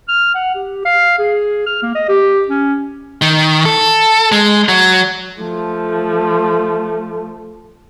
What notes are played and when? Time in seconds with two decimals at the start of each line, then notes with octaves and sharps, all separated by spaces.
0.08 F6
0.35 F#5
0.55 G4
0.85 F5
1.19 G#4
1.67 F6
1.83 A#3
1.95 D#5
2.09 G4
2.48 C#4
3.22 D#3
3.65 A4
4.32 G#3
4.69 F#3
5.38 F3 A3